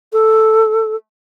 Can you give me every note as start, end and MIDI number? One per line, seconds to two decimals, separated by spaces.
0.13 0.96 69